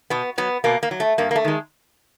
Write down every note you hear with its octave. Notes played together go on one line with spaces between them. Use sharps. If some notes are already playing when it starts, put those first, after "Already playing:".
B2 B3
F#3 B3
B2 A#3
A#3
F#3
A3
G2 A#3
A#3
A3
D#3 G#3